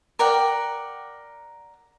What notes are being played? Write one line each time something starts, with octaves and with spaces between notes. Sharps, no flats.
A#4 D5 F#5 G5